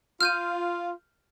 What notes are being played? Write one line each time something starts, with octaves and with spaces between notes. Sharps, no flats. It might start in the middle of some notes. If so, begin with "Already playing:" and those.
F4 F6 G6 D#7